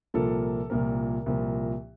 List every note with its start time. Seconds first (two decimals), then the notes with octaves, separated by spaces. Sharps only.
0.14 C2 A#2 F3 A#3 A4
0.70 C2 A#2 F3 A#3 A#4
1.26 C2 A#2 F3 A#3